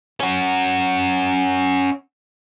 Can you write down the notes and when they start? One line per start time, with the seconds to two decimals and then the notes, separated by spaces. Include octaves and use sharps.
0.20 C#4 F#4